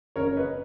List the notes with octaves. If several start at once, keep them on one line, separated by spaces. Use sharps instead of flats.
F#1 F2 C#3 A#4 C#5
B4 D#5